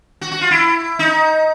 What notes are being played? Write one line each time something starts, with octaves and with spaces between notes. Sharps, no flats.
F#4
F#4
F4
E4
D#4